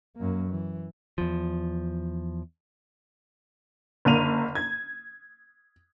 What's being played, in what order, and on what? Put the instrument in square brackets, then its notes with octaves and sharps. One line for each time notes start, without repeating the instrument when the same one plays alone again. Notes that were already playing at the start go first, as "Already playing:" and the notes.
[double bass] F#2 A#3
E3
[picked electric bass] E2 F3
[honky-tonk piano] F#1 D3 A#3 D#7 F7
G#6